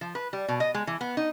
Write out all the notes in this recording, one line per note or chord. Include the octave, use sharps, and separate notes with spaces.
F3
B4
G3
B2
D#5
G#3
E3
B3
D#4